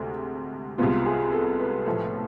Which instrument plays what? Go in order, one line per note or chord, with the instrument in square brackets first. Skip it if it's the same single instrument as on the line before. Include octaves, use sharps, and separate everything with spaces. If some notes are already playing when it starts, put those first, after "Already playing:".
Already playing: [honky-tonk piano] D2 C3 G#3 [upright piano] A4
[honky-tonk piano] C2 C3 G#3 B3 [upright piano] F4
[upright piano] G#4
A4
B4
[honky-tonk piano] B1 A2 F3 A3